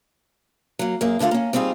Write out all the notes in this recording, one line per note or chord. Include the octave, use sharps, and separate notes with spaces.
F#3 A#3
F#2 A#3 G#4
D#2 D3 A3 F4 F5
A#3 C#4
G3 C4 D#4 F4 G#4